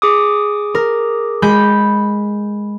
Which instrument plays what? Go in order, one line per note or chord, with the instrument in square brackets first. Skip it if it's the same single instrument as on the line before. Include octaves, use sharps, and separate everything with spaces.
[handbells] G#4 D6 D#6
[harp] A#4
G#3 B5 G6